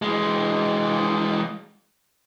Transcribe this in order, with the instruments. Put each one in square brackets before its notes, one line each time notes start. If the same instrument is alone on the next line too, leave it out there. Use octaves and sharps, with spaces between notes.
[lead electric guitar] E3 G#3